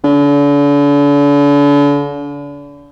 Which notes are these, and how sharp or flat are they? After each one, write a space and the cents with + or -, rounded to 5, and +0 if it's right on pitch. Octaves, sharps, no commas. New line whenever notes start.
D3 -40